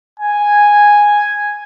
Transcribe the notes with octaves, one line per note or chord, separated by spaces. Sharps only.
G#5